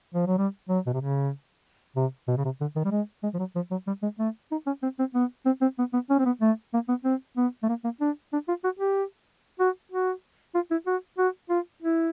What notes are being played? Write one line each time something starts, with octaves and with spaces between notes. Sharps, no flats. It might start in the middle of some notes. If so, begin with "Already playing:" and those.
F3
F#3
G3
F#3
B2
C3
C#3
C3
B2
C#3
C3
D3
D#3
G3
G#3
G#3
F3
F#3
F3
F#3
G3
G#3
A3
D#4
C#4
C4
C4
B3
C4
C4
B3
B3
C#4
C4
B3
A3
A#3
B3
C4
B3
A3
A#3
A#3
D4
D4
F4
F#4
G4
F#4
F#4
F4
E4
F#4
F#4
F4
E4